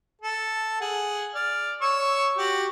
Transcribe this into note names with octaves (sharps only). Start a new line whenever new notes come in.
A4
G#4 F#5
D5 F6
C#5 C#6 E6
F#4 G4